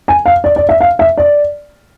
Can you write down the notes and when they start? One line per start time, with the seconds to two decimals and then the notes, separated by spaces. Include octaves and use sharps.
0.08 G#5
0.26 F5
0.44 D5
0.56 D5
0.69 E5
0.81 F5
0.99 E5
1.18 D5